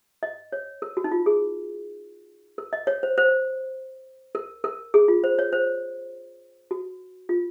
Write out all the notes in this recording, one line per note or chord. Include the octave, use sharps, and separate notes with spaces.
D#5
C#5
A#4
F#4
D#4
F4
G#4
A#4
D#5
C#5
C5
C5
A#4
A#4
G#4
F4
C5
C#5
C5
F#4
F4